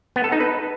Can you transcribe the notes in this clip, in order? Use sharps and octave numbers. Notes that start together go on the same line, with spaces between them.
B3
A4
D#4
B4